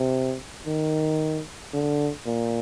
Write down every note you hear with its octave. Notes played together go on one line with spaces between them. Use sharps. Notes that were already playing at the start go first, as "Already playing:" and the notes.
Already playing: C3
D#3
D3
A#2